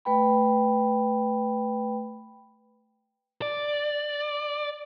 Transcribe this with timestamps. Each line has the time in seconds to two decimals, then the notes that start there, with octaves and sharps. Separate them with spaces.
0.05 A3 B4 G5 B5
3.42 D5